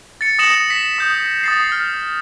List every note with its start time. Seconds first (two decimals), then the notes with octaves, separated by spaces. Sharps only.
0.21 A6 C#7
0.39 D#6 A#6 C#7 E7 F#7
0.70 B6
0.99 D#6 G6
1.43 D#6 A6 C7
1.72 F6